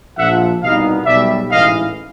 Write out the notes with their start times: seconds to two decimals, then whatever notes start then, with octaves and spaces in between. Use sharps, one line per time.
0.17 A#1 A#2 F3 E5 F#5
0.62 C2 B2 G3 B3 D#4 D#5 F5
1.06 B1 B2 G3 D5 E5
1.51 A1 G#2 E3 D#5 F5